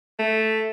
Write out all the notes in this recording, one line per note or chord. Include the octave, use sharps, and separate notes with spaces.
A3